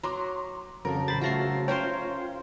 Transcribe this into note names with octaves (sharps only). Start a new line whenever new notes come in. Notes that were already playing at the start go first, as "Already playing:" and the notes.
F#3 A#5 C6 D6
F2 C#3 F3 F#3 A4 A#4
A1 C5 B5 A6
A3 F4 F#4 A#6 C7
C#4 F4 A#4 C5 C#5 G5 C6